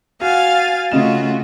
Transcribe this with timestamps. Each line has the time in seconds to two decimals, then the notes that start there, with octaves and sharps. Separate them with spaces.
0.21 F#4 F5 G#5 A6
0.92 C#3 A3 F4 F#4 D#5 E7